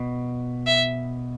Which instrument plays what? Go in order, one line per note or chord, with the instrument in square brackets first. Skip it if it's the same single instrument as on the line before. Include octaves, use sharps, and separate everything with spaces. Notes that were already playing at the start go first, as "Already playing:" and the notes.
Already playing: [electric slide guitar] B2
[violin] E5